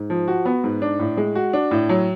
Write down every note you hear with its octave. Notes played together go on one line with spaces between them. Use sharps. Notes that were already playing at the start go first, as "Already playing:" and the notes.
Already playing: G#2
F3
F#4
B3
G#2
D4
A2
G#3
F#4
D4
A2
F#3